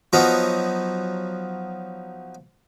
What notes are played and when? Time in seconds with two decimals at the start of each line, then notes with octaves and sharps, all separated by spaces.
0.13 F3 F#3 B3 D#4